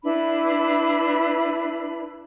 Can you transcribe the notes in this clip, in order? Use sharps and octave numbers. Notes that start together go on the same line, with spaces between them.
D4 E4 B4 B5